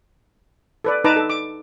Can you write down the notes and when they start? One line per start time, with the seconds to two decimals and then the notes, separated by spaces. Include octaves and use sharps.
0.84 A4 B4 D5
1.04 D#4 B4 A5 A#5 D6
1.16 A4
1.30 D6